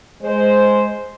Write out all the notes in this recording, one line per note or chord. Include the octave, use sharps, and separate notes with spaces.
G#3 C5